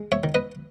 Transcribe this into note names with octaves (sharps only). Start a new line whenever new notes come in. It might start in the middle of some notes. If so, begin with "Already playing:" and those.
Already playing: G#3
C#5 E5
D#3
B4 D#5